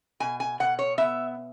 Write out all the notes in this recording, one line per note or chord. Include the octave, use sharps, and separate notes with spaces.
B2 G#5
G#5
B2 F#5
C#5
B3 E5